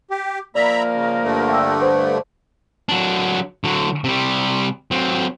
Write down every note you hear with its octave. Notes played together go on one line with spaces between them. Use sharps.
G4
F3 A#3 A#4 D5 E5 A#5 B5
C#3
G2 D3 A3
E5 G5 E6
B4 C5
F#3 D4
D3 F#3
C3 G3
F#3 C4